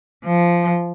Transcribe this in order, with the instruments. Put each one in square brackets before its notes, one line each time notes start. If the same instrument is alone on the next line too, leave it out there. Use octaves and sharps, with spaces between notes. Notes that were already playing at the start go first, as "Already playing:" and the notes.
[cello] F3